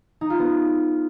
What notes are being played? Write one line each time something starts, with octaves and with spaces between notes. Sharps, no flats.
D#4
F4
B3